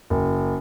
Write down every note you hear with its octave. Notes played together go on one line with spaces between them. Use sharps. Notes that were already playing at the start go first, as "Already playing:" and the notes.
F#1